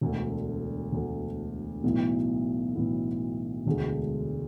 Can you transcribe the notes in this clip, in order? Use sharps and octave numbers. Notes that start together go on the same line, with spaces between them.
E1 D2 D3 A3
E1 D2 D3 A3
B1 A2 E3 B3 E4
B1 A2 E3 B3 E4
E1 D2 D3 G#3